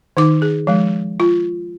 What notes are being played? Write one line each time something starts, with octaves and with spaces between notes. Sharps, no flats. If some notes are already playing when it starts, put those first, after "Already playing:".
D#3 D#4 D6
G#4
F3 G#3
F4